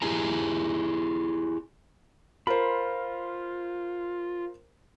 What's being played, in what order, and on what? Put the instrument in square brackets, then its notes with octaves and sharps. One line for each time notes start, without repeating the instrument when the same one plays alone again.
[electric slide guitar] E4 G4 G#4 A#5
[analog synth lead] F4 [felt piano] A#4 C5 [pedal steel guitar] B5